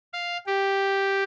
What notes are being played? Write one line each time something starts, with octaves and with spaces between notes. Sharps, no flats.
F5
G4